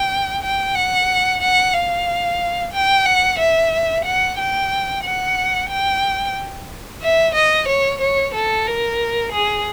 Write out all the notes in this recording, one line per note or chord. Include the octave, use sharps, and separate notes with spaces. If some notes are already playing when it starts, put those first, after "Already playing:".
Already playing: G5
G5
F#5
F#5
F5
G5
F#5
E5
F#5
G5
F#5
G5
E5
D#5
C#5
C#5
A4
A#4
G#4